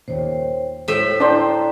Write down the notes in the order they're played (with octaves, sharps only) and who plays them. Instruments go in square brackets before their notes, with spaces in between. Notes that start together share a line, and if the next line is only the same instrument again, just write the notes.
[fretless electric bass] D#2 A#2 [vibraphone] C5 C#5 G5
[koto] A2 E5 [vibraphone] C5
[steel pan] D4 C5 [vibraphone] E4 G5 A#5